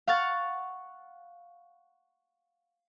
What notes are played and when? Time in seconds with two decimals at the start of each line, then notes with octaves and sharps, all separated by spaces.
0.07 F5 F#5 C#6 F6 A6